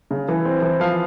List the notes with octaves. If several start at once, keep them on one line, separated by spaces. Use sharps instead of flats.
C#3
E3
C4
E3
F3 F5